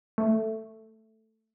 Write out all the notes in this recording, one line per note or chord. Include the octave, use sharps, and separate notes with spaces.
A3